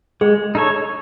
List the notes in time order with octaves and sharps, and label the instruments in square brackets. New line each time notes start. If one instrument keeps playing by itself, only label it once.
[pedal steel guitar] G#3 [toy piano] G#4
[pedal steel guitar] D#4 A4 C#5